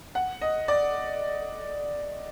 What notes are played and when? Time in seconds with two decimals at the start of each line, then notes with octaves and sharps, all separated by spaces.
0.15 F#5
0.41 D#5
0.68 D5